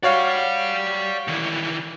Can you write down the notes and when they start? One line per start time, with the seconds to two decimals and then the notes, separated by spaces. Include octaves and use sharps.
0.03 F#4 C#5 D5 F5 G5
1.28 D#3 E3